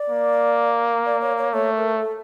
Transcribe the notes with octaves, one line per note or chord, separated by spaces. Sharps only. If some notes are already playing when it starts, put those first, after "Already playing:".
Already playing: D5
A#3
D5
C#5
C#5
A3 C#5
A#4
A4